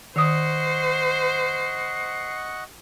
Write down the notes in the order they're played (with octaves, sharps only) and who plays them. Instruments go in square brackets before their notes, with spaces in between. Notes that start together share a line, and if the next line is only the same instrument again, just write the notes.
[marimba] D#3 D#6 [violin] C5 [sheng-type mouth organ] D#5 F#5 C#6 [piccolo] C7